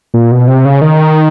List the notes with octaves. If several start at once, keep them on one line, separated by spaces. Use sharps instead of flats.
A#2
B2
C3
C#3
D#3